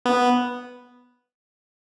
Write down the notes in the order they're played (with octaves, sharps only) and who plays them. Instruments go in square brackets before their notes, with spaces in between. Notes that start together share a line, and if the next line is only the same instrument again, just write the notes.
[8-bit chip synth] B3